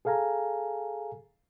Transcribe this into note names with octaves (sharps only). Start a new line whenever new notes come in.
G#4 A4 F5 G#5 A#5